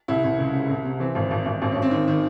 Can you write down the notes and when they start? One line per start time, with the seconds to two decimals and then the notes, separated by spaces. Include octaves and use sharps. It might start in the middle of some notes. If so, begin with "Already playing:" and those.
0.08 C2 E4
0.24 C2
0.39 C#2
0.54 C#3
0.70 C2
0.85 C3
1.00 E3 C4
1.15 G#1
1.31 G#1
1.46 G#1
1.61 G#1 C4
1.72 C#4
1.76 G#1
1.82 C4
1.91 D#3
2.08 D#3